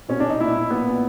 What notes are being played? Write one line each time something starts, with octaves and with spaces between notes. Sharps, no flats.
B2 C#4
D4
B2 D#4
A#2 E4
A#2
A#2 B3
A#2